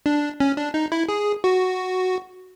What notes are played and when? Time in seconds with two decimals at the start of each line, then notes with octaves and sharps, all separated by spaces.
0.06 D4
0.40 C#4
0.57 D4
0.74 D#4
0.92 E4
1.09 G#4
1.44 F#4